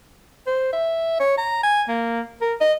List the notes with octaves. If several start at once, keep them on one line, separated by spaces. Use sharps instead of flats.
C5
E5
C#5
A#5
G#5
A#3
A#4
D#5